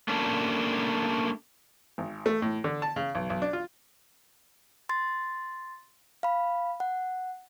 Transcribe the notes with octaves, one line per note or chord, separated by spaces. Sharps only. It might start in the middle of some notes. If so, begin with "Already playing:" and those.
A3 A#3 C#4 D4
G#1
A3
A2
D3
A5
C#3
B1
B1
D4
F4
C6 A6
F5 B5
F#5